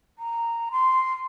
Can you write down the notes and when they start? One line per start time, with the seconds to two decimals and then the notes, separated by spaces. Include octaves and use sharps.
0.19 A#5
0.72 C6